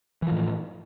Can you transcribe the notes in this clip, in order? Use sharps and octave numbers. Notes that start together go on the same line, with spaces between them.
A2 E3 F3